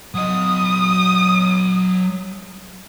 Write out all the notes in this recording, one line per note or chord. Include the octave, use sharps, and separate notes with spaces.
F#3 D#5 D#6